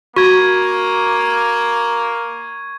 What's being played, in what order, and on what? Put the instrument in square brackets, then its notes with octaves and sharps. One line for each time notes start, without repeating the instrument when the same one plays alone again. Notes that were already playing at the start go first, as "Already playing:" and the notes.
[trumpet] A#3 [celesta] F#4 [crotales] C#6 G#6